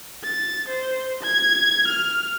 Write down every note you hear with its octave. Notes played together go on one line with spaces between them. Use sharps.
A6
C5
G#6
F6